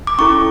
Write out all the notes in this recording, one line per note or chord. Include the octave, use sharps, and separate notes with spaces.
D6
C#4 E4 A4 C#6